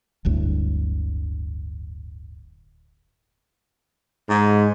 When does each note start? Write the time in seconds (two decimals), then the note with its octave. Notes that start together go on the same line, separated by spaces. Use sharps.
0.25 D1 G1 D2 A2
4.30 G#2